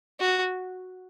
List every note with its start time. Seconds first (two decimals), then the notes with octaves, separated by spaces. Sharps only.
0.20 F#4